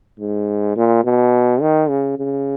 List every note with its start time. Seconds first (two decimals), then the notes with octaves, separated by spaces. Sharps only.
0.20 G#2
0.77 A#2
1.05 B2
1.61 D#3
1.89 C#3
2.18 C#3